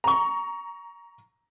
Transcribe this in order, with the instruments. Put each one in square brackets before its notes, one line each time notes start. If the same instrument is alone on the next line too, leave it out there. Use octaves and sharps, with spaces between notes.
[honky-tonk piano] A#5 C#6